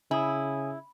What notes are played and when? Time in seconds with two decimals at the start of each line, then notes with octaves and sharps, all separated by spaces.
0.11 C#3 E4 G#5 D#6